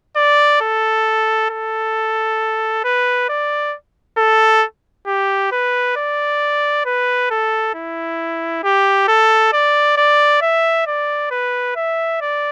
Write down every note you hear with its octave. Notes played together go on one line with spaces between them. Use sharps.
D5
A4
A4
B4
D5
A4
G4
B4
D5
B4
A4
E4
G4
A4
D5
D5
E5
D5
B4
E5
D5